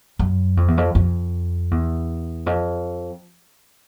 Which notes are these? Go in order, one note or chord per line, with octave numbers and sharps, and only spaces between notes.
F#2
F2
E2
F2
F2
E2
F2